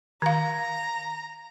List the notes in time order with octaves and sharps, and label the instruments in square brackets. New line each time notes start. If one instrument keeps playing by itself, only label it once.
[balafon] D#3 F5 [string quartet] A#5